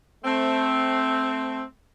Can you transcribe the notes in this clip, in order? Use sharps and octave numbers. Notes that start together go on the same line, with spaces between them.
A3 C4